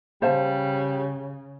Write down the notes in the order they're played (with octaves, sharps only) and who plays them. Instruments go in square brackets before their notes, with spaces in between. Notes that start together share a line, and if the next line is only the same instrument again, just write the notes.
[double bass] C#3 [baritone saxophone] G3 [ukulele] C5 F5 A5